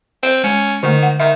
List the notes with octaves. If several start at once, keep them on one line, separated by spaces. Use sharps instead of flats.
C4
G#3 C#4
D3 D#3 A3
F#5
D#3 E5